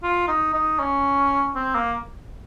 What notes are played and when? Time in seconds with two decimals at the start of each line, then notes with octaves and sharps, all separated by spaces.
0.03 F4
0.28 D#4
0.54 D#4
0.79 C#4
1.56 C4
1.75 A#3